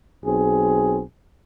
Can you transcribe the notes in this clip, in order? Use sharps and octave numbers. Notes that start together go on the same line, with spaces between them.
B1 C4 G#4